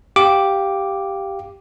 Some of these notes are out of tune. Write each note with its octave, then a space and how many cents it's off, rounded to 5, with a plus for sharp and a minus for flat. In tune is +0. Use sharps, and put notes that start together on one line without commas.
G4 +0 F5 +0 D6 +0